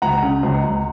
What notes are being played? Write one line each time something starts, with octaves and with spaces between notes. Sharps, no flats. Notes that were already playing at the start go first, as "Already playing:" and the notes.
C#2 F#5 A#5
C#3
C#2
C#2